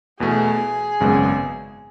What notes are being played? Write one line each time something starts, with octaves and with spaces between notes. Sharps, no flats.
E2 B2 A3 G#4
G#1 F#2 C#3 G#3 B3